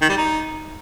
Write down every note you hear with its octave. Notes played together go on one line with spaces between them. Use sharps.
D#3
G3
D#4